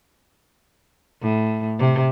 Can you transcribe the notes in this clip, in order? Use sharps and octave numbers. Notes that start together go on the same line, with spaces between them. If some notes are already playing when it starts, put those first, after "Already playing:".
A2
C3